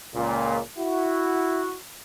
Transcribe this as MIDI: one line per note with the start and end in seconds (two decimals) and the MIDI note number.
0.14 0.59 37
0.14 0.59 46
0.79 1.75 64
0.79 1.75 66